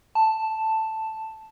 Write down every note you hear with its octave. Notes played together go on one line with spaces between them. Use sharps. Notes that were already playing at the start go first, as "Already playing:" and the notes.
A5